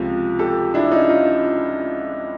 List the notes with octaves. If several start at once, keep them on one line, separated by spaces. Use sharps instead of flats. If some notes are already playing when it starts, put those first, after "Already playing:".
Already playing: C#2 C3 F3
G4 A4
D4 E4
C#4 D#4
D#4 F4